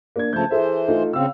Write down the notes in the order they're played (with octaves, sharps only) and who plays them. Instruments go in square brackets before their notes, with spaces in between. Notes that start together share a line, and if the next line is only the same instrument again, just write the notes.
[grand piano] A#3 D4 G#6
[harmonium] C#3 F3 A3 [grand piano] A5 G6
[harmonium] E3 C5 [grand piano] G#4 A4 E5
[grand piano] A3 D#4 F4
[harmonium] C#3 C4 [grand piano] F5 E6